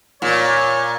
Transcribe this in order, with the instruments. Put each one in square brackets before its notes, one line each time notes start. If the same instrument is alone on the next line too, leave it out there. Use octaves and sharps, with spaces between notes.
[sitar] A#2 [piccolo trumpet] C#5